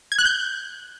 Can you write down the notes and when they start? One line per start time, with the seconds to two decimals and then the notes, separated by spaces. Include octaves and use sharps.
0.12 G#6
0.19 F#6
0.25 G6